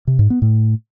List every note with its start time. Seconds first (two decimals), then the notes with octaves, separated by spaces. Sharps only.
0.07 C3
0.19 G#2
0.30 B3
0.42 A2